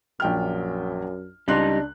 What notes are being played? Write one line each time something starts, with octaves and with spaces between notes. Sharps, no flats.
A#1 F#2 G5 F6
C#2 G3 D4 D#4 C6 F#6